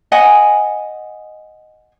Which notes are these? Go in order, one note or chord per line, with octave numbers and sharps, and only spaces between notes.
D#5 F#5 G#5